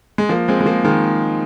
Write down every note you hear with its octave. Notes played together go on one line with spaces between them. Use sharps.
G#3
F3 A#3
G#3 C4
G#3
F3 A#3
D#3 G#3